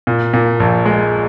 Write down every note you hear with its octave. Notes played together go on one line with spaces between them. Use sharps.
A#2
A#2
A#1
G#3